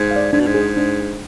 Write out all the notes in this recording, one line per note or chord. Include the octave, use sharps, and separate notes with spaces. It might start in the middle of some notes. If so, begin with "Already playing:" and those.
Already playing: G#2
F5
D5
G#2 D4
B2
G#2
G#4 C5
D4